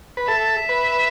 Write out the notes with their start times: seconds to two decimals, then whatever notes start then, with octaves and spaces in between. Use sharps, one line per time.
0.17 B4
0.28 A4 E5
0.69 B4